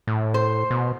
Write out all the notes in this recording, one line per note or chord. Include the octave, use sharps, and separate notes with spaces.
A2
C5
B2